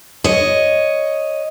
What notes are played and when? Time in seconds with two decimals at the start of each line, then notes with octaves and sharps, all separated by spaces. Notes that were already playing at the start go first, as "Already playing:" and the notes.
0.24 C#5 D#5